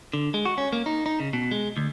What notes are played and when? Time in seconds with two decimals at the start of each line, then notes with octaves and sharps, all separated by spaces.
0.13 D3
0.34 G#3
0.45 F#4
0.58 C#4
0.73 A#3
0.86 D#4
1.06 D#4
1.20 C#3
1.33 B2
1.51 G#3
1.77 D2